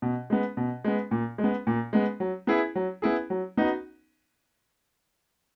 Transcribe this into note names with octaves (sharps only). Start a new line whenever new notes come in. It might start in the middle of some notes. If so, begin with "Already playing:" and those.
B2
G#3 B3
B2
G#3 B3
A#2
G#3
B3
A#2
G#3 B3
F#3
B3 E4 G#4
F#3
B3 E4 G#4
F#3
B3 D#4 F#4